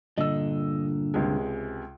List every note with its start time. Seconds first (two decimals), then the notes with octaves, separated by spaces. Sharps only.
0.18 G2 A#2 D3 D#5 E6
1.14 C#2 C3 G#3